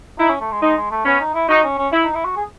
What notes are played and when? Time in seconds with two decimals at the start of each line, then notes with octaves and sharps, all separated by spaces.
0.19 D#4 E4
0.29 C#4
0.41 A3
0.52 G#3
0.62 G#3 D#4
0.77 G#3
0.91 A3
1.06 B3 C#4
1.20 D#4
1.35 E4
1.49 D#4 F#4
1.64 C#4
1.78 C#4
1.92 E4
2.04 D#4
2.15 E4
2.25 F#4
2.36 G#4